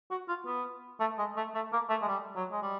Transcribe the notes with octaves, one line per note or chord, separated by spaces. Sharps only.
F#4
F4
B3
A3
G#3
A3
A3
A#3
A3
G#3
G3
F#3
G#3
G3